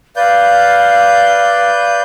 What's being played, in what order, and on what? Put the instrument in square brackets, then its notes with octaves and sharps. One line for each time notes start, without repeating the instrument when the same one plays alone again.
[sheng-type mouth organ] B4 D5 G6 [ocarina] F5